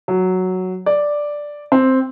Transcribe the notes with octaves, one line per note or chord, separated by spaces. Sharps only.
F#3
D5
C4